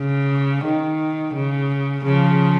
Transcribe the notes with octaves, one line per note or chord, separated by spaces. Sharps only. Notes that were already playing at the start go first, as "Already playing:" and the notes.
Already playing: C#3
D#3
C#3
C#3 F3